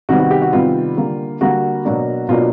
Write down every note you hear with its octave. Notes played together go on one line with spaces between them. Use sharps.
C3 D#3 G3 B3 F#4
F#4
G4
F#4
C3 D#3 G3 B3 F4
D3 G3 A#3
D3 G3 A#3 F#4
B2 F#3 A#3 D4
B2 F#3 A#3 D4 F4